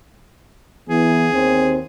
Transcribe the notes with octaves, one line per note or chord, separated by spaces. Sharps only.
E3 B3 G#4
D#2 C4